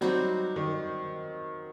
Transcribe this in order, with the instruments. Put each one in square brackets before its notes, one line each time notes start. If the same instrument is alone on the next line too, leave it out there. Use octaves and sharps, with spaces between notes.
[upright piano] F#3 [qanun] G3 C4 D#4 F#4
[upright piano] D#3